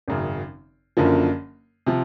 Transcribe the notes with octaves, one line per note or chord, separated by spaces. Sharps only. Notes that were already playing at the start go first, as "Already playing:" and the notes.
G#1 F#2 C#3
F#1 F#2 D3 F3 A#3
C3 F3